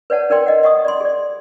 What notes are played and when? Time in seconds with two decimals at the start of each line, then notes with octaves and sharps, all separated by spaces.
0.10 B4 C#5 D5 F#5 A5
0.30 D#4 A#4 D5 G5 C6
0.46 D#5 F#5
0.63 D#5 F#5 C#6 D#6
0.85 D5 B5 C6
1.01 G#4 D5